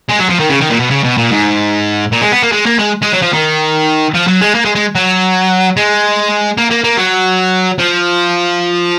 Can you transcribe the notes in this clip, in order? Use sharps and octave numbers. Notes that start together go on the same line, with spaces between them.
G#3
F#3
F3
D#3
C#3
D#3
A#2
B2
C#3
B2
A#2
G#2
A#2
G#3
B3
A#3
G#3
A#3
G#3
G#3
F#3
F3
D#3
F3
F#3
G#3
A#3
G#3
G#3
F#3
G#3
A#3
A#3
A#3
F#3
F3